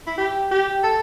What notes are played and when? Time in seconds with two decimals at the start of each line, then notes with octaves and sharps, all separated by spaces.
0.07 E4
0.18 G4
0.51 G4
0.83 A4